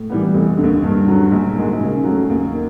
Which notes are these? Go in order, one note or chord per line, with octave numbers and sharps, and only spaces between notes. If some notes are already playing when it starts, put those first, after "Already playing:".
Already playing: A2
E3 G3 B3
F1
D3
D#2
G2
D3 F#3
A#1
G#2 D#3 G#3
C#3
F#3 A3
D#2
D#3